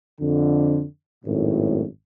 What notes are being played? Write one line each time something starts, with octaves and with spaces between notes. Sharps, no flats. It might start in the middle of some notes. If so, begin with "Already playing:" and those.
F2 D3
G#1 F#2 A2